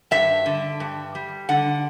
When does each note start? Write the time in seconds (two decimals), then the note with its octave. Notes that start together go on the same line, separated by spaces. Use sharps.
0.11 G2 E5
0.46 D3
0.80 G2
1.15 G3
1.49 D3 F#5